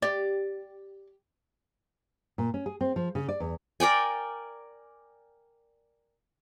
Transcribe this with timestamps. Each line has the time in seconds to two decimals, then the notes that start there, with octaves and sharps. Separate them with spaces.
0.02 G4 D5
2.38 A#2
2.54 C#4
2.66 G#4
2.81 C4
2.96 F3
3.15 C#3
3.29 D5
3.40 E2
3.80 A#4 D5 G5 G#5